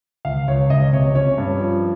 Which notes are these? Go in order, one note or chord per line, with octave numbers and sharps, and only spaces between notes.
C#2 F5
C#2 C#5
C#2 D#5
C3 C#5
C#4 C#5
G2
F3